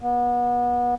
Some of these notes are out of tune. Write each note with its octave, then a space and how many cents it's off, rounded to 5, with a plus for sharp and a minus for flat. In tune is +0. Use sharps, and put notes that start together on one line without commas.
B3 -30